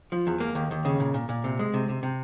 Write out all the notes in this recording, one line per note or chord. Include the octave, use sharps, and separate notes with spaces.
F3
E2
A#3
D#2
D#2
C#3
A#2
A#2
A#2
C3
G#3
C3
C3
C3